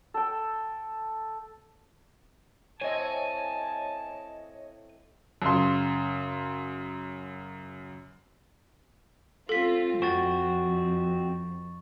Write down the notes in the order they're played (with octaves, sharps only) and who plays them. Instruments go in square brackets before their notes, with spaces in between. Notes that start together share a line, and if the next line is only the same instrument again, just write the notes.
[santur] A4 G5
[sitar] A2 C4 [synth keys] C#5 D#5 [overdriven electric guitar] G#5 [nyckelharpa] A5
[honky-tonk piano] F#2 C#3 C6
[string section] C4 F4 [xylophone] A4 B6
[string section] F2 [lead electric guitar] C4 F#4 [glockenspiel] C#6 A6